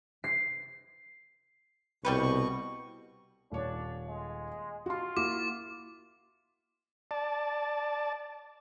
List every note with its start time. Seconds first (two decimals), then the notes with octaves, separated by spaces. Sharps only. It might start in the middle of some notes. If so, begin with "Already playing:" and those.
0.24 C7
2.05 C2 B2 G3 G4 B4 C#6
3.52 D#1 D4 C#5
4.08 G#3
4.86 F4 F#4 C6
5.17 A#3 E4 F#4 D6
7.11 D5 A5